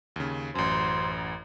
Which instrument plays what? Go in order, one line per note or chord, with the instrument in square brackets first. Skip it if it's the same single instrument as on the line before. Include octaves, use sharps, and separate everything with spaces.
[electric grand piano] D#2 C#3
[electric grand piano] A1 F#2 [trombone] C5